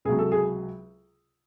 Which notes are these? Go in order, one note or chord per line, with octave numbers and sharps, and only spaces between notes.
C#2 C3 F#3 G#4
A4
G#4